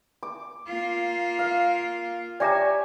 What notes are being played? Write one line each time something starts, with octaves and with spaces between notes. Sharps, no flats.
D6
A#3 F4
F5
G4 C#5 D5 E5 G#5 A#5